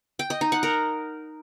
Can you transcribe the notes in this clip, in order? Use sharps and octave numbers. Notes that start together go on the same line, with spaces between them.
G5
D#5
D#4
F#5
A#4